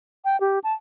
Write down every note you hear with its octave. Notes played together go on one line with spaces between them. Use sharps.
G5
G4
A5